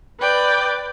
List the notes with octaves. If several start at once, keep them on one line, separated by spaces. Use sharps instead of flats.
B4 D5 G5